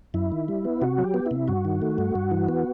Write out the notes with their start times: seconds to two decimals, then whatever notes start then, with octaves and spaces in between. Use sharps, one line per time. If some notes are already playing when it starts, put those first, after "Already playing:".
0.14 F#2 E4
0.32 D#3
0.48 G3
0.65 B3
0.82 C3 F#4
0.98 F#3
1.04 G4
1.14 B3
1.26 C3 E4
1.48 G2 F#4
1.65 D#3
1.82 A3
1.98 G2
2.15 G2
2.31 E3
2.49 B3